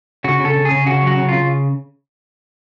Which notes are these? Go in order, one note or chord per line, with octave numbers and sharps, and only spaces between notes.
C#3 F#4
C#3 A4
C#3
G#4
C#3
C#3 F#4
F#3 F#4
C#3
C#3 F4